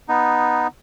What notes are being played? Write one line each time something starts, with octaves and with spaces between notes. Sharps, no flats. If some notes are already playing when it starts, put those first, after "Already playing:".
B3 D#4